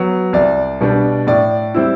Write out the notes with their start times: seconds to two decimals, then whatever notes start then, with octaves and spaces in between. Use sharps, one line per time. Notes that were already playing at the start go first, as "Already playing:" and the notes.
Already playing: F#3 B3
0.33 C2 D5
0.81 B2 G3 B3 D4
1.27 A2 D5
1.74 G3 C4 E4